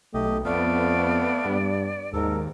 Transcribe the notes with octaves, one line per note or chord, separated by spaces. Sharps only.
B1 A3 G4 D#5
F2 A3 B3 D5 F5
G2
D#2 G#2 A4 A#4